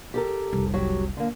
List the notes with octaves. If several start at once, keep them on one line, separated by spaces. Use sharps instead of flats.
G4 A4 A#4
F1 C2
F#3 G4
D3 A#3